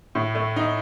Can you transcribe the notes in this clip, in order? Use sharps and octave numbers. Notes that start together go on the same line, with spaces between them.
A2
A3
D#4